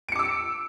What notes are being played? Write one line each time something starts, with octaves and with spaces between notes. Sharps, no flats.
D6 E6 C#7 D7